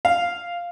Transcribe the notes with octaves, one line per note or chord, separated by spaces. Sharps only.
F5